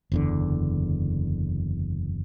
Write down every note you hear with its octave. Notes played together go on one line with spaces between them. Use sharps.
F#1 E2 D3